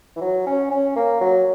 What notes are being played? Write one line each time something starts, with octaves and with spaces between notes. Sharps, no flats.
E3
F#3
C#4
C#4
A#3
F#3